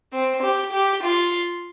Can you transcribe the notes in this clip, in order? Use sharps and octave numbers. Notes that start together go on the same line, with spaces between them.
C4
G4
G4
F4